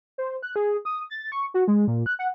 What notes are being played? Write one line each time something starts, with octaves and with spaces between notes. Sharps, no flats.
C5
F#6
G#4
D#6
A6
C#6
F#4
G#3
A#2
F#6
F#5